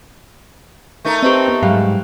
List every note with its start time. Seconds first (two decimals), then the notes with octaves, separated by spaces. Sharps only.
1.05 A3 D#4 A#4
1.23 C4 G4 B4 D#5
1.48 B3
1.63 G#2 F#3 G3 F5